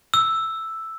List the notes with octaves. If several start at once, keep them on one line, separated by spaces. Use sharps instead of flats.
E6